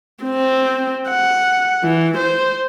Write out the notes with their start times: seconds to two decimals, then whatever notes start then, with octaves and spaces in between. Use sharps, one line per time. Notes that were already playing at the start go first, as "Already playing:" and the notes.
0.24 C4
1.09 F#5
1.84 E3
2.18 C5